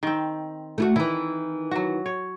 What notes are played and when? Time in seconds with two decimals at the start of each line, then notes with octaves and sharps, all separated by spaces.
0.03 D#3 C4
0.78 A3 E4 F#4
0.96 D#3 E3 E4
1.71 F#3 F#4
2.06 C#5